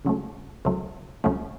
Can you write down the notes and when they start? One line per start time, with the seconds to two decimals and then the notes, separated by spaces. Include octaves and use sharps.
0.05 C#2 C#3 F#3 A3
0.65 C#2 C#3 F#3 A3
1.24 C#2 C#3 F#3 A3